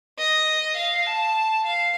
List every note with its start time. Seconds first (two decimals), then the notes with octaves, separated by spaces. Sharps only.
0.18 D#5
0.76 F5
1.06 A5
1.65 F5